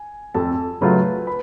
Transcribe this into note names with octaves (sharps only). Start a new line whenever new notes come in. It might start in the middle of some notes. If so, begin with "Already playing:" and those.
Already playing: G#5
F2 A4 A5
C#3 F#3 A3 F4 B4 B5
B4 B5